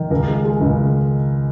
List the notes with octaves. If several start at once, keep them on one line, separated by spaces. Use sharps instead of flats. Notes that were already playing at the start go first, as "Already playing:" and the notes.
Already playing: D#3
C#2 A#4
G#3
G#3
C#2
C#3